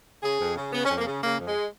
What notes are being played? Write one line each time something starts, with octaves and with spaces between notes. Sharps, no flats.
C#3 G#4
F2
C#3
C#3 B3
C#4
F2
A#3
C#3
C#3 A#3
F2
G#3